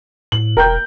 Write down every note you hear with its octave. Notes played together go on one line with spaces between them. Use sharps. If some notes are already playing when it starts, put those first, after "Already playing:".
A2 F#7
E1 A#4 G5 G6